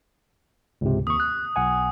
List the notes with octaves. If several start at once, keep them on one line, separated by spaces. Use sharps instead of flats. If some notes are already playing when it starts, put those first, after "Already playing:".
C#2 G#2 C3
D#2 C#6 D#6
F#6
B1 F#5 G#5